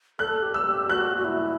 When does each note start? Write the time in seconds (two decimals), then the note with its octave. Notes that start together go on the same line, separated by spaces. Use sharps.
0.19 A4 F#6
0.42 G4
0.54 E6
0.66 G4
0.89 F#4 F#6
1.17 F#4
1.24 E4